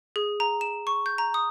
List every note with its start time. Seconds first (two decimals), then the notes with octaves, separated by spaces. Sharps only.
0.16 G#4
0.40 A#5
0.61 E7
0.87 C#6
1.06 G6
1.18 A#5
1.34 D#6